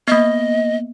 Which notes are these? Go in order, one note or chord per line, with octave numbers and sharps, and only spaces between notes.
A#3 B3 D#5